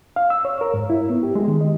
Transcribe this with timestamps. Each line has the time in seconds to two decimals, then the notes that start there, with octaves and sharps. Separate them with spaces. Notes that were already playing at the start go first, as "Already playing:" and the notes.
0.16 F5
0.30 E6
0.45 C#5
0.61 A#4
0.74 G#2
0.90 E4
1.10 B3
1.23 G4
1.35 G#3
1.48 D#3
1.61 D#5